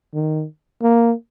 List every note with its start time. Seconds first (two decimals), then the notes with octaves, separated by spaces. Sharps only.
0.14 D#3
0.82 A#3